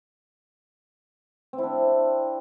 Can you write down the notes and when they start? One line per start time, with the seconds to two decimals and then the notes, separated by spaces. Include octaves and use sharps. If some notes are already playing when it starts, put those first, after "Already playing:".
1.53 C4
1.58 E4
1.63 D4